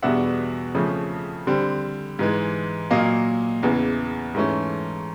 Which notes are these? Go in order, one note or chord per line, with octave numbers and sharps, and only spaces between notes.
E2 B2 G3 B3 D4 E5 F#5
F2 C#3 F3 A3 C#4
D3 G3 C4
G#2 E3 G#3
A#2 F#3 A#3 D#5 F5
E2 C#3 E3
G#2 E3 A3 C#4